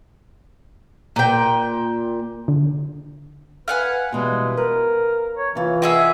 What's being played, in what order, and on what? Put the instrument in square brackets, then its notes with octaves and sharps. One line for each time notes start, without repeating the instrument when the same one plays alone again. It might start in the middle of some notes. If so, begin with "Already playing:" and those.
[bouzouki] A#2 G5
[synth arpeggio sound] D3
[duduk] B4 [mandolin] F5 F#5 G#5
[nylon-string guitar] B2 E3 G3 [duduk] G#3
[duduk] A#4 [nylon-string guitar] B4
[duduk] C#5
[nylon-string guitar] C3 F4 [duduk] E3
[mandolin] A#3 G#4 E5 [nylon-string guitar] F4 D#5 F#5